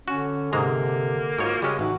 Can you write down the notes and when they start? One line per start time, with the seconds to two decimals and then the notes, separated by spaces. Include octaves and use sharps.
0.08 D3 C#4 F#4
0.53 G#2 C3 G#3 A#3 A#5
1.39 G#2 F4 F#4 C#5
1.62 C#3 G3 G#3 C#4
1.79 A1 E3 D#4 F#4